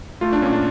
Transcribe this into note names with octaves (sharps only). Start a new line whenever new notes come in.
A3 F4
D4
A#2 C#4
D4